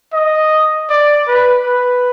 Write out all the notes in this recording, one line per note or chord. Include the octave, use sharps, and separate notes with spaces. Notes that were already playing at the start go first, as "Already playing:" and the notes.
D#5
D5
B4
B4